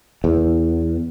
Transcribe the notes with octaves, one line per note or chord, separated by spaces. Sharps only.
E2